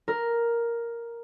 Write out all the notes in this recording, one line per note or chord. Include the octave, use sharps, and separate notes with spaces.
A#4